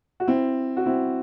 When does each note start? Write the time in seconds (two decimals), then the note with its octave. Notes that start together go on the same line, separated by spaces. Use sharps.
0.20 F#4
0.27 C4 E4
0.77 F#4
0.86 C4 E4